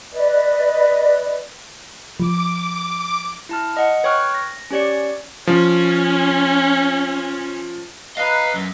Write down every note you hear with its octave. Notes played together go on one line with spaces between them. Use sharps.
B4 D5 D#5
F3 D6
E4 A5 F6
D#5 F#5 C#7
B4 C#5 G5 C#6 F6 F#6
A#6
C#4 G4 C#5 D5 C#7
F3 C#4
B4 D#5 F5 A#5 F#6
F#2